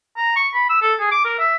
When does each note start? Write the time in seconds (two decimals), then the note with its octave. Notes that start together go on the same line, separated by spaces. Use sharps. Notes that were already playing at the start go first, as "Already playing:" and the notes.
0.17 A#5
0.36 C#6
0.54 B5
0.70 E6
0.82 A4
1.00 G#4
1.11 D6
1.25 A#4
1.39 E5